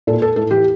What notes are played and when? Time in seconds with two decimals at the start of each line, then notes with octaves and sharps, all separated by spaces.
0.07 A#2 A4
0.22 A4
0.36 A2 A4
0.51 E3 G4